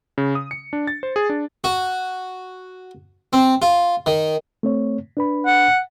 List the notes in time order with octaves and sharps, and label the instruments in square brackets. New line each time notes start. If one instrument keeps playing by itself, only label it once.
[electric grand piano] C#3
D#6
C#7
D4
A6
C5
G#4
D4
[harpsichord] F#4
C4
F4
D#3
[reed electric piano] A3 C4 C#5
D4 B4 B5
[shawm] F#5